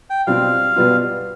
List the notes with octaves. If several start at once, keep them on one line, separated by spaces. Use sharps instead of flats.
G5
B2 G3 C4 F4 F5
B2 G3 B3 F4